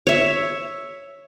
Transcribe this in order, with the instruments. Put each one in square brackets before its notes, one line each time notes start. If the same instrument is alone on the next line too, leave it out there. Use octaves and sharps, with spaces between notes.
[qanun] C#5 E5